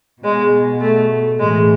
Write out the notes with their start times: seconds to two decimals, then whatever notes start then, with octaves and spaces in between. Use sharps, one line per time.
0.23 B2 G#3
0.81 A3
1.38 A2 E3 G#3